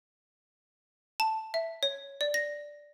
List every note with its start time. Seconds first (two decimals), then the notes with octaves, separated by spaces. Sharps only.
1.20 A5
1.54 E5
1.83 C#5
2.21 D5
2.34 A#6